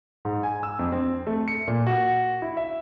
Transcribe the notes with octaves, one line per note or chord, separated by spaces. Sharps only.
G#2
G#5
E6
F2
C4
A3
C#7
A#2
F#4
E4
E5